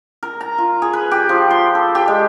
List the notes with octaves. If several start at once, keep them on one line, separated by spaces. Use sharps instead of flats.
A#4
A#5
F4
G#4
B4
G4
F3
C6
A4
G4
G#3